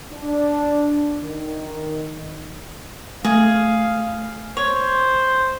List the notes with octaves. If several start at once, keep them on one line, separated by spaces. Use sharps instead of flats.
D4
D#3
A3 G#4 F5
C5 C#5